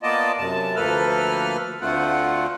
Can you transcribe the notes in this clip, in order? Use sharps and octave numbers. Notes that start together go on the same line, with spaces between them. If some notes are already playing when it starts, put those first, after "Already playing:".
A#3 B3 F4 D5 D#5 A5
F#2 C3 A5
D2 F3 A#3 A4 B4 F6
D2 D3 A3 C4 F4 F#5